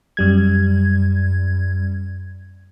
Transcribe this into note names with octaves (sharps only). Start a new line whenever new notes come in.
F#2 G3 G#6